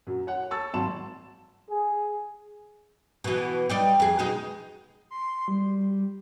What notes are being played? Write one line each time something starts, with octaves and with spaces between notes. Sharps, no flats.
F#2 F#3
C#5 F#5
A5 C#6 E6 A6
G#1 F#3 A5 C6 E7
G#4
B2 E3
G3 D#4 D5
F2 G#4
B2 G#3 D#4
C6
G3